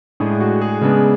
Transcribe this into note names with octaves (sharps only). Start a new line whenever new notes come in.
A2 G#3 D4 G#4
F#4
G#4
C#3 G#3 B3 D4